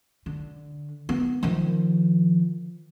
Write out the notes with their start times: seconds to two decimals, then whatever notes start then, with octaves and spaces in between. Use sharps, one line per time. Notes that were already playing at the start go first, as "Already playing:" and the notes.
0.26 D3
1.09 B3
1.43 D#3 F3